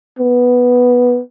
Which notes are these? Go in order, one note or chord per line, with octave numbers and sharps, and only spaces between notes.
B3